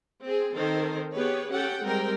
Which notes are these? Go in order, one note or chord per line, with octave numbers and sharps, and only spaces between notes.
C4 G#4
D#3 C4 A4 A#4 C5
B3 G4 G#4 B4 C#5
C#4 G4 A4 F#5 G5
G3 G#3 C4 A#4 G5